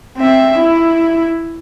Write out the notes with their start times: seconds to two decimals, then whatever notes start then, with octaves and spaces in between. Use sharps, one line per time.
0.18 C4 E5
0.58 E4